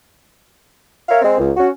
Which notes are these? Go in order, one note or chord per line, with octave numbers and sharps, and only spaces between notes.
A#4 C#5 E5 F5
G#3 C4
C#2
C#4 F#4